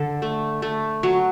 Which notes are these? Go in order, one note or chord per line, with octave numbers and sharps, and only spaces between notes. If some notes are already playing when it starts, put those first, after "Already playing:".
Already playing: D3 A4
A3
A3
F#3